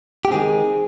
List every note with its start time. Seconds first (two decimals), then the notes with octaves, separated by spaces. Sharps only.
0.25 G4
0.31 D#3 G#3 C4 G#4